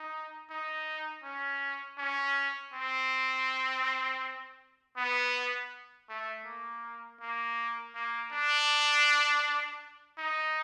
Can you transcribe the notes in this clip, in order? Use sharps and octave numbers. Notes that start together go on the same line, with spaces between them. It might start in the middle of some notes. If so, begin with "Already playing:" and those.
Already playing: D#4
D#4
C#4
C#4
C4
B3
A3
A#3
A#3
A#3
D4
D#4